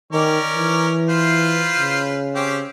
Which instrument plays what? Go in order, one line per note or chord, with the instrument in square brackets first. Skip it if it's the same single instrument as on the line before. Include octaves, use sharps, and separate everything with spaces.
[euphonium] D#3 [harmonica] C#4 A#4 D5
[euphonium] E3
[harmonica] F4 B4 C5
[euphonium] C#3
[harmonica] C4 C#4 G4